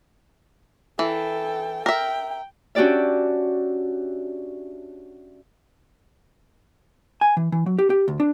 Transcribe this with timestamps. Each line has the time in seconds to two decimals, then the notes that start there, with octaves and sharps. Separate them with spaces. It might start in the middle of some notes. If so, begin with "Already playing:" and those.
0.99 E3 A4 G5
1.86 A#4 E5 G5
2.75 C#4 D4 F#4 G4 D5 E5
7.21 G#5
7.37 E3
7.52 E3
7.66 F#3
7.79 G4
7.90 G4
8.08 D2
8.20 D4